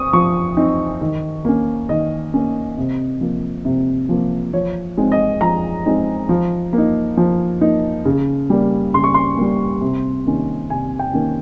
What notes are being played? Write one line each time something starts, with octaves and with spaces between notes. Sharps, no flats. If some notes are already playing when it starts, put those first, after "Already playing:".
Already playing: C4 C#6 D#6
F3 C#6
C4 D#4
D#3
A#3 C#4
D#3 D#5
A#3 C#4
C3
F3 A#3
C3
F3 A#3
F3 C#5
G#3 C4 D#4
D#5
F3 A#5
G#3 C4 D#4
F3
A#3
D#4
F3
A#3 D#4
C#3
G3 A#3
C#3 C6
C#6
C6
G3 A#3
C3
D#3 A#3 C#4
C3 G#5
G5
D#3 A#3 C#4